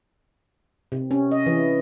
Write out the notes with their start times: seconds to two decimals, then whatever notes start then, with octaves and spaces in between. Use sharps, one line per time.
0.92 C3
1.11 C#4
1.31 D#5
1.46 E3